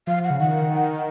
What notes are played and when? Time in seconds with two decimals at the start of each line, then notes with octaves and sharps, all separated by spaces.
0.07 F3 F5
0.24 F#5
0.30 C#3
0.40 D#3 F#5